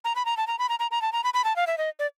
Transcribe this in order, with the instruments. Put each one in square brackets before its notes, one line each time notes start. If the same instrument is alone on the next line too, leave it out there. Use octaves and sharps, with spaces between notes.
[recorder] A#5
B5
A#5
A5
A#5
B5
A#5
A#5
A#5
A5
A#5
B5
B5
A5
F5
E5
D#5
D5